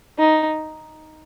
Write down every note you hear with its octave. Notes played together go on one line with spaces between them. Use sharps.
D#4